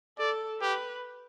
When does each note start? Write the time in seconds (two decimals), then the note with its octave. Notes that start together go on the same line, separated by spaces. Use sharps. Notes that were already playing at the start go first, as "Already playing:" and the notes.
0.18 A4 D5
0.61 G4 B4